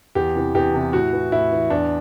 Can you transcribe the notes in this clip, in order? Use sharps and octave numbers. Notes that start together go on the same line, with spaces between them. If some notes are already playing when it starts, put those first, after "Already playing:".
E2 G4
C3 E3
E2 G4
C3 E3
A2 F#4
E3
A2 E4
E3
E2 D4